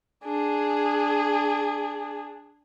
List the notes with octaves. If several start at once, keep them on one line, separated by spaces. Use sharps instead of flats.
D4 G#4